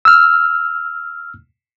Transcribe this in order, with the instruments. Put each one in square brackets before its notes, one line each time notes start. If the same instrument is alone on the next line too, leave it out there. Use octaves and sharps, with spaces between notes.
[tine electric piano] E6 F6